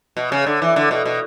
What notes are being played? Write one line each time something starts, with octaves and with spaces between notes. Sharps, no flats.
B2
C#3
D3
E3
D3
B2
B2